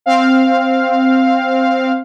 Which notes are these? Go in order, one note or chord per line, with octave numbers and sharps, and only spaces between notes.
C4 F5